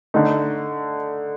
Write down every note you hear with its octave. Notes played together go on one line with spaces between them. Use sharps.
D3 A3 D#4